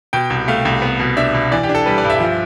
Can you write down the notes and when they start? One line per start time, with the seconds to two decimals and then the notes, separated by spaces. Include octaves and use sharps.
0.13 B2 G5
0.30 C2
0.48 A3 F5
0.65 C2
0.82 B3
0.99 B2
1.17 D4 E5
1.34 B2
1.52 E3 D5
1.63 G4
1.69 D4
1.75 A4
1.86 G3 B4
1.98 D5
2.04 G2
2.10 E5
2.20 F3